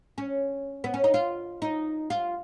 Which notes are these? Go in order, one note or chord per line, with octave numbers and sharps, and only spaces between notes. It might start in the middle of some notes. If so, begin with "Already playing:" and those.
C#4
B3
C#4
D#4
F4
D#4
F4